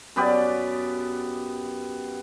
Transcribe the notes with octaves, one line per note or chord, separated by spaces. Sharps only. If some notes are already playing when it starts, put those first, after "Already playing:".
F#2 B3 G4 D5